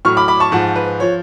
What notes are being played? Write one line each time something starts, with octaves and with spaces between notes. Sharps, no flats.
A2 F#3 C#6 F6
B5 D6
B5 D6
A5 C#6
G#2 F3 F#5 A5
B4
F3 C#5